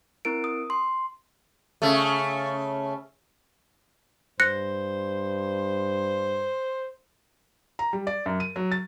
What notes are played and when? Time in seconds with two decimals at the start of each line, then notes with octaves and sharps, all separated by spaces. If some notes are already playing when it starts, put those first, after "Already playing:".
0.25 C4 E4 A#4 D7
0.44 D#6
0.70 C6
1.82 C#3 A3
4.40 G2 C5 F#6 A#6 C#7
7.79 A#5
7.93 G3
8.07 D5
8.26 F#2
8.40 D#7
8.56 F#3
8.72 A6